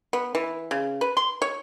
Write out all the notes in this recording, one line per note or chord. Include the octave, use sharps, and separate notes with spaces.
B3
E3
C#3
B4
C6
C#5